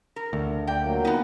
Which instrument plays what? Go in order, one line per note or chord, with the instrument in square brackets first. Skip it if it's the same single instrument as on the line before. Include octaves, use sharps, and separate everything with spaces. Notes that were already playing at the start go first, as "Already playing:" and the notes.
[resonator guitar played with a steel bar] A#4
[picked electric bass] D2
[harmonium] D5 [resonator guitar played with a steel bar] G5
[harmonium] A#2 F#3 A#3
[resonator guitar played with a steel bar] B3 D#4